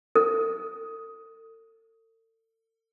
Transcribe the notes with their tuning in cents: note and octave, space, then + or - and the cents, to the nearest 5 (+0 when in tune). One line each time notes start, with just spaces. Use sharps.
A4 +40